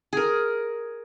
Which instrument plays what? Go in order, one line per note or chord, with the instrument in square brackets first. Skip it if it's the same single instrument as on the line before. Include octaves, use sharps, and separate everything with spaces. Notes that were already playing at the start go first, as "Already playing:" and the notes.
[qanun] G#4 A#4